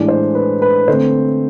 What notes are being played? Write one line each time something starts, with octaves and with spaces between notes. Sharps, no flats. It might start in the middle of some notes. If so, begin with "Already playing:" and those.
Already playing: A2 E3 G#3 D4 D5
C5
B4
B4
D3 A3 C4 C5